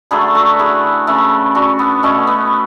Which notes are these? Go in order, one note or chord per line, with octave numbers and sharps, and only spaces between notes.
D3 F#3 A3 G#4 B4
F#4 A4
E4 G#4
C#3 E3 A3
D4 F#4
B3
B2 A3 C#4
B3